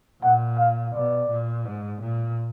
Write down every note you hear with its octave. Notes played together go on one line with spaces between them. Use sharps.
A#2 F#5
F5
B2 D5
A#2
G#2
A#2